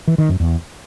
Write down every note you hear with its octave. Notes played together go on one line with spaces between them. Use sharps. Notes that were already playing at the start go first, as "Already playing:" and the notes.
E3
D#3
F#2
E2